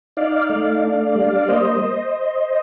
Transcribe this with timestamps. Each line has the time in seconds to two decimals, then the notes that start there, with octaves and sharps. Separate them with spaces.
0.17 D#4 D5 F5
0.50 A3
0.83 D4
1.15 G3
1.48 A#3 C5 D#5